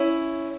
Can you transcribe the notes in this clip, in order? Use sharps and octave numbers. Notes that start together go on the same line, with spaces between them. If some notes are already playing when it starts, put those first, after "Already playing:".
Already playing: C#4 E4